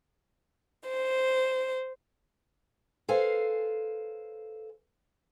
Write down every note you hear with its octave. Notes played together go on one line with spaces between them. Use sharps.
C5
A4 B4 C5 F5 G#5